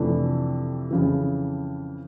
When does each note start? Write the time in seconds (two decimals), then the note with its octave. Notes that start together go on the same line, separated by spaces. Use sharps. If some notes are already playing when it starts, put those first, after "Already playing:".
Already playing: F2 C3 E3 A3 D4
0.91 F2 C#3 E3